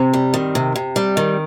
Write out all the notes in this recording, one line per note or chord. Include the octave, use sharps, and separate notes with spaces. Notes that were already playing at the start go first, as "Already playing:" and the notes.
Already playing: C3 C4
G3
D#3
C3
C3
G3
D#3